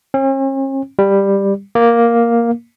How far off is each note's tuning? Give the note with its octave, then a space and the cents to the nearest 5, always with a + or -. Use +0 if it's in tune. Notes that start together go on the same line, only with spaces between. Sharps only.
C#4 -45
G3 +10
A#3 +5